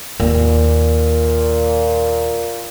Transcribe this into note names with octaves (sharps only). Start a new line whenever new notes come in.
D#2 A#2